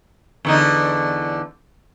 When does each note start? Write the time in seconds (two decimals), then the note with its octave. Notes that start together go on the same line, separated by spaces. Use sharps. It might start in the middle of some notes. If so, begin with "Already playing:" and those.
0.45 E2 D3 D#4